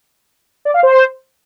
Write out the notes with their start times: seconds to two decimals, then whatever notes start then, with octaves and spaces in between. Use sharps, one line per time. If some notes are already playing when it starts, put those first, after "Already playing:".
0.65 D5
0.74 F5
0.83 C5